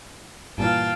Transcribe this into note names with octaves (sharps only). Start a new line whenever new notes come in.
G2 A#2 E3 F5 G5 A5